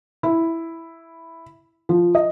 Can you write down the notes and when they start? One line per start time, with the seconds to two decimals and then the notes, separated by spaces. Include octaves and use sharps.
0.23 E4
1.89 F3
2.15 D#5